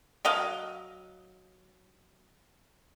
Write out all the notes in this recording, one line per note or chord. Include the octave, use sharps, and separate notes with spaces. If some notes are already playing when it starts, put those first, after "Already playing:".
F#3 D#5 F5